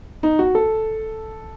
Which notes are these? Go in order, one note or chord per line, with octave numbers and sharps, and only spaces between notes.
D#4
F#4
A4